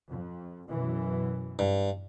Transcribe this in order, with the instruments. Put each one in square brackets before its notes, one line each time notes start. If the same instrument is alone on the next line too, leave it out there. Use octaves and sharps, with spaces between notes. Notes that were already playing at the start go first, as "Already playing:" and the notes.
[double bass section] F2
F#2 B2 E3
[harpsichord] G2